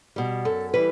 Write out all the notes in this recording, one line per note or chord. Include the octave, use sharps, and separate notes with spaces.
B2 G3
F#2 A4
E3 G3 B4